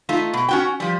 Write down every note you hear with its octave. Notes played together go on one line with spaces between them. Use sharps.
A3 D#4 F4
B2
C#4 F#4 G5
F3 G3